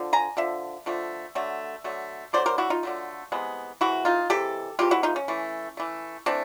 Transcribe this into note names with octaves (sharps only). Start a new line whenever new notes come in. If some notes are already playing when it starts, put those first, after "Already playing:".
Already playing: D3 F3
G#5 A#5
D3 F3 E5
D3 F3 A3
D3 F#3 A3
D3 F#3 A3
D3 F#3 A3 C5 D5
A#4 C5
E4 F#4
D#4 F4
D3 F#3 A3
C3 E3 G#3 B3
C3 E3 G#3 E4 F#4
D#4 F4
C3 E3 G#3 G4 A4
C3 E3 G#3 F4 G4
E4 F#4
D#4 F4
C#4
E3 A3
E3 A3
E3 A3 C4 D4